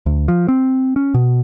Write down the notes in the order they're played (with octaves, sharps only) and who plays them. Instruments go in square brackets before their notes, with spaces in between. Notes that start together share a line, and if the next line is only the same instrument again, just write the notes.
[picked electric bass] D2
F3
C4
C#4
B2